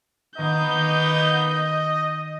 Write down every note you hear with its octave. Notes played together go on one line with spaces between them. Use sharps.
D#3 A#3 B3 D#4 D#5 G6